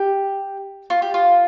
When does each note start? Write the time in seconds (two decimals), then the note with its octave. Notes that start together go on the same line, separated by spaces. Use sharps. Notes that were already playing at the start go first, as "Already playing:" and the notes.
Already playing: G4
0.90 F4
1.02 G4
1.14 F4